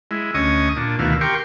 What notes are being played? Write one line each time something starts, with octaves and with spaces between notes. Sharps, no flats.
G#3 E4
D2 C#4 D#5 C#6 D#6
A#2 D4
D2 B2 D#3 E4 F5
G4 A#4 G5 C6 C#6